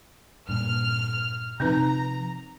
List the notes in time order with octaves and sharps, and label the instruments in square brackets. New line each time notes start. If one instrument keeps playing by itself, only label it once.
[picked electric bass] G2 A#2 [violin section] F6
[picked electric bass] C3 F3 [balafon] C4 D#4 B4 [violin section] A#5